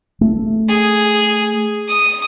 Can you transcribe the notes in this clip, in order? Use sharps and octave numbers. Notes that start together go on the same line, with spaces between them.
A3
G#4
D#6